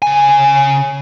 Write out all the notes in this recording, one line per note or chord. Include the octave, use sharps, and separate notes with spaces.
C#3 G#5